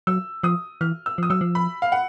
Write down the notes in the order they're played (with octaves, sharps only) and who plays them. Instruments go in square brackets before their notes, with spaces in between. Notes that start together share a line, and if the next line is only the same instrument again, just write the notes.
[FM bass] F#3 [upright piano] E6
[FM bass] F3 [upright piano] D#6
[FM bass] E3 [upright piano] F6
[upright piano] E6
[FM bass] F3 [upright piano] D#6
[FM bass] F#3 [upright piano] E6
[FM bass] F3
[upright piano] B5
F5
F#5